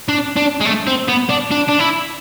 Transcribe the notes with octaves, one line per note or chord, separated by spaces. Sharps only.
D4
D4
G#3
A3
C4
B3
D4
D4
D4
E4